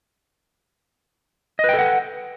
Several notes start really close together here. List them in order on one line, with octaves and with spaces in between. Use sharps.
D#5 B4 G5 A4 F#5